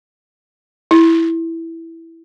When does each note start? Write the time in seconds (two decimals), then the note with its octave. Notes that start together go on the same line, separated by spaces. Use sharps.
0.91 E4